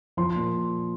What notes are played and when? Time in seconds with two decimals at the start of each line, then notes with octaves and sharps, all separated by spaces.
0.17 F3 C6
0.35 A#2